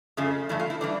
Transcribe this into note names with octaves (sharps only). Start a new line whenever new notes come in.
F2 C#3 F3 A3
G2 E3 A3 E4
F4
E4
E3 G3 D4